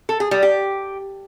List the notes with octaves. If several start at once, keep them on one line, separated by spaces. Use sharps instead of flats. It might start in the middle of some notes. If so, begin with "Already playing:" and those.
A4
G#4
G3
G4